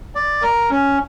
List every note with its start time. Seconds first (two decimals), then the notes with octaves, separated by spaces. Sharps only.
0.15 D5
0.42 A#4
0.70 C#4